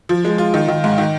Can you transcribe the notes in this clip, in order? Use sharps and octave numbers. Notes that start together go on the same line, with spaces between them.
F3
G#3
F4
D#3
D#3
G#2
D#3